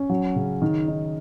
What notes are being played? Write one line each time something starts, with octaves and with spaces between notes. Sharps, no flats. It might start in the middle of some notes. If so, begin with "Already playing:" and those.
Already playing: C#4
F#3
C#3
D#3
D#4